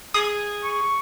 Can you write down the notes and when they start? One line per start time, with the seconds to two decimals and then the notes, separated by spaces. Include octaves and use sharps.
0.14 G#4 D#6
0.64 C#6